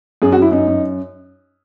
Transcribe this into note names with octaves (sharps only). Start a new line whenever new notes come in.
F#2 G#4
F#4
F#2
E4
F#2 D#4
F#2